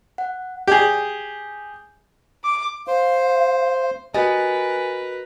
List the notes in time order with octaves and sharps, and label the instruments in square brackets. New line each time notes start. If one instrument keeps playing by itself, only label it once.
[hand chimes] F#5
[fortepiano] G4 G#4
[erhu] D6
[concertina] C5 [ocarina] F5
[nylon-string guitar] F#4 G4 D#5 [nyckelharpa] A#4 B4 [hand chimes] G#5 A6